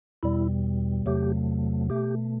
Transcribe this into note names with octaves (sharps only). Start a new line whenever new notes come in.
E2 B2 G3 E4
E2 C3 F#3 A3 G4
B2 A3 G4